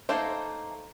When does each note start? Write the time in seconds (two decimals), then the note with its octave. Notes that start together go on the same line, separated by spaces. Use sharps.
0.09 A3 A#3 D#4 A4 C5